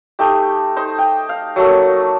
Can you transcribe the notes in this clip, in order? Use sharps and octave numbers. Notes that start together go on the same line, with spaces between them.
A3 D#4 G4
D#4 C5
G5
F5
F#3 A3 A#3